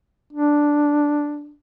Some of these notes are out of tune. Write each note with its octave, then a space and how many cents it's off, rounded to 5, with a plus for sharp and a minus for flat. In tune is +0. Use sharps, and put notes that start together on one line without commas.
D4 +0